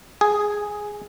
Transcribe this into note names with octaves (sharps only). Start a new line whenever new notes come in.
G#4